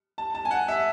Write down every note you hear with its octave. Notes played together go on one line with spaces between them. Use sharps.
A5
A5
G#5
F#5
E5